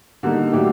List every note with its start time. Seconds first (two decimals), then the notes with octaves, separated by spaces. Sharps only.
0.23 D3 G3 A#3 D#4
0.53 D3 F#3 A3 D4 G4